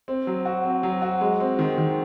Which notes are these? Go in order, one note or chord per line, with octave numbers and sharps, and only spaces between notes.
C4
F#3
F#4
C4
F#3
F#4
G#3
C4
D#3
D#3